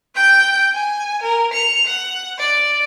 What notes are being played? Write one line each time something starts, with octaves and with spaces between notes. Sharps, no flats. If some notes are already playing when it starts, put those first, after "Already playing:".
G5 G6
G#5
A#4
C#7 F7
F#5
D5